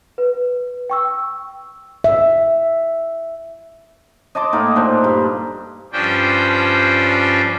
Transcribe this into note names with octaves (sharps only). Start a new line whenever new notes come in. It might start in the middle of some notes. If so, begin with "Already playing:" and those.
B4
G5 C#6 E6
E5
D#5 A5 C6 D6
A2 A#3 D#4
A#2 D4 C5
G2
G2 F3 C#4 D4 C5 G5